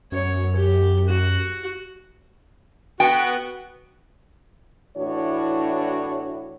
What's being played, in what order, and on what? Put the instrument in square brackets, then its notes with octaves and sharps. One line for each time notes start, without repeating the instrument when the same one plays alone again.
[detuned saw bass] F#2 [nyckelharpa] C#5
[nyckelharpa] G4
F#4
[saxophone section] B3 F#4 [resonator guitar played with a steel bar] G5
[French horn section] A2 E3 D4 E4 F#4 C#5